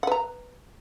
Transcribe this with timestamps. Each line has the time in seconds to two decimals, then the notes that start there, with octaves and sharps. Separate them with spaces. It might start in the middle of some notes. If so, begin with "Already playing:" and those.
0.03 F#5
0.07 B4
0.12 A#5